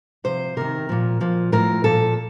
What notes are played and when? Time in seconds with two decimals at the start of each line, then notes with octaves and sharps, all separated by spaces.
0.24 C3 F3 C5
0.57 C3 D#3 A#4
0.89 A#2 F3
1.20 A#2 F3
1.52 A2 F3 A#4
1.84 A#2 F3 A4